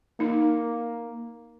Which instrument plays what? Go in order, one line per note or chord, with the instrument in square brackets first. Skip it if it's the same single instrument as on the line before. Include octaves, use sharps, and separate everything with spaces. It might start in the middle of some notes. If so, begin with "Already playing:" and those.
[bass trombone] A#3 [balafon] D#4